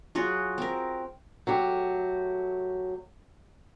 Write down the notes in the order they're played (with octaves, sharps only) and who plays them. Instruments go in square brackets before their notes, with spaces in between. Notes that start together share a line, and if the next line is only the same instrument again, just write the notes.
[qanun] F#3 F4 F#4 G#4
C4 A#4
[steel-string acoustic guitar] F#3 A3 G4